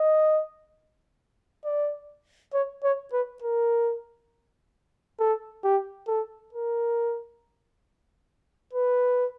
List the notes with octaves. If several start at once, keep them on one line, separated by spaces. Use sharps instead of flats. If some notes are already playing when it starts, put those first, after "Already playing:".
Already playing: D#5
D5
C#5
C#5
B4
A#4
A4
G4
A4
A#4
B4